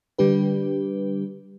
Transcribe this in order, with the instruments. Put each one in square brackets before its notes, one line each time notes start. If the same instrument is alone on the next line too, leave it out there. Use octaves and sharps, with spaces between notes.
[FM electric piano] D3 G3 D4 G4 B4